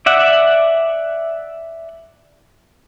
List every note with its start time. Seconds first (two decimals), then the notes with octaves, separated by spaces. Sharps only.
0.06 D5 E5 F#5